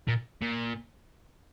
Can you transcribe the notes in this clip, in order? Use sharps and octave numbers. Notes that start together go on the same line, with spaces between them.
A#2
A#2